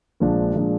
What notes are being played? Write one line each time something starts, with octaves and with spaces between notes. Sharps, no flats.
A#1 A#2 F3 G#3 D4
A#2 F3 G#3 D4